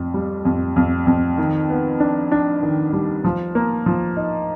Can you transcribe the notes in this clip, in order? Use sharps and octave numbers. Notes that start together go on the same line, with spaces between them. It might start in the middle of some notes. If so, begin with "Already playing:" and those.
Already playing: F2
G3
F2
F2
F2
D#3
B3
D4
D4
D#3
G3
F3
A#3
F3
D#4